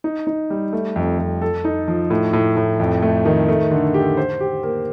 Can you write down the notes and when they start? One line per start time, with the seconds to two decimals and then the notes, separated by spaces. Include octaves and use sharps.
0.04 D#4
0.27 D#4
0.50 G3
0.73 A3
0.96 F2
1.19 F2
1.42 A4
1.65 D#4
1.88 F3
2.10 A2
2.33 A2
2.57 A2
2.80 F2
3.02 A3
3.25 D#3
3.48 A3
3.71 D3
3.94 G4
4.17 C5
4.40 G4
4.63 A#3